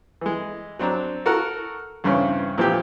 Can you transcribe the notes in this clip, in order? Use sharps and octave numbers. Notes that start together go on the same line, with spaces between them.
E3 G#3
F#3 C4 D4 A#5
F#4 A4 A#4 F#5
E2 G2 C#3 C4 C#4
A#2 E3 F3 C4 F4 G4